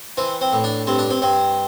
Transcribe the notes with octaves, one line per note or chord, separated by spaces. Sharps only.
E3 C4
C4
A2
D4
G2 C4
D4
C4
G2 C4